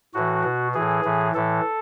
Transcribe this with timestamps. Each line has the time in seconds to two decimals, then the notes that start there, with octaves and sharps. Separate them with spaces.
0.14 A2 E3 F#4
0.44 B2
0.74 A2 E3 G#4
1.05 A2 E3
1.34 A2 E3 A4